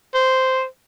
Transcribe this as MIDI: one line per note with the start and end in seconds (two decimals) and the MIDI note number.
0.14 0.65 72